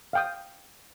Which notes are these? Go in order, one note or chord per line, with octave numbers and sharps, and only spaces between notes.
F5 G5 D#6